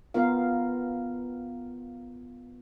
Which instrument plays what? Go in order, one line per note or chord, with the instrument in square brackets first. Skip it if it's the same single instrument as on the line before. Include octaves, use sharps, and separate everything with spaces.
[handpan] B3 F4 A#4 F5